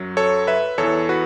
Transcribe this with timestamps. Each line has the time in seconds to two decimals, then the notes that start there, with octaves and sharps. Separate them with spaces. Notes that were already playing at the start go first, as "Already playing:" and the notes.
Already playing: F#2 F#3
0.17 A4 C#5
0.47 B4 E5
0.78 E2 A4 C#5
0.83 E3
1.09 F#4 B4